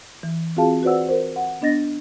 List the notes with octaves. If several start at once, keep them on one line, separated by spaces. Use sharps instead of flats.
E3
C4 F4 F#4 G#4 F5 A5
F#4 B4 C5 D5 F#5 E6
A#4 C5
F#5
B3 D4 D#5 A6 A#6